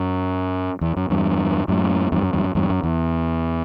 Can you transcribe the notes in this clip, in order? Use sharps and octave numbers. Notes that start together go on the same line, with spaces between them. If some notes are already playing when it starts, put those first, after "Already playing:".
Already playing: F#2
E2
F#2
E2 G2
F#2 A2
E2 G2
F#2
E2 G2
F#2
E2 G2
F#2
E2